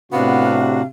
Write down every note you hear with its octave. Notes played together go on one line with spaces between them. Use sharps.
A2 C3 B3 D4 F#4 F5